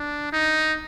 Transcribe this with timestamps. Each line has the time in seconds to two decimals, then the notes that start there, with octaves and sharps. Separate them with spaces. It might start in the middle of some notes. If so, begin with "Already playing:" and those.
Already playing: D4
0.32 D#4